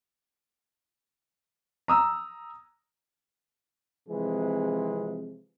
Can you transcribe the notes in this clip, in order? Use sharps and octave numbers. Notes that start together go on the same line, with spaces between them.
A#5 D#6 E6
C3 E3 F3 G#3 C4 G#4